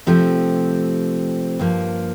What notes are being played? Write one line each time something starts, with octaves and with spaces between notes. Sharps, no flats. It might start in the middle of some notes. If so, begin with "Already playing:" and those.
C3 F3 A3 C4 G4
G2 F3 A#3